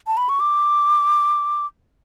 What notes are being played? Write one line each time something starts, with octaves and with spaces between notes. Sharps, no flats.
A5
B5
C#6
D6